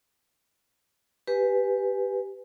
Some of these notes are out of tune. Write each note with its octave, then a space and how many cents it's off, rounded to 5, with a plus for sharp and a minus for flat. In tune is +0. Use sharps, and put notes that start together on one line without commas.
G4 +0 B4 +0 G#5 +0